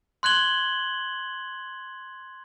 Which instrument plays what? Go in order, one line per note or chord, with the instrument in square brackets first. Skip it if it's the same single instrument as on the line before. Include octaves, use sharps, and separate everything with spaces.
[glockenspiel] C6 F#6 G#6 F#7 G7